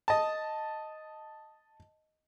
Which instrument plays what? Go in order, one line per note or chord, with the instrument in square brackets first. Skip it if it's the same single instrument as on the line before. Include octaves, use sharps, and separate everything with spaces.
[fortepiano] D#5 A5